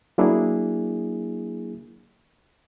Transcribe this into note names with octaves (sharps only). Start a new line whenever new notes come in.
F#3 A#3 D4 E4 G#4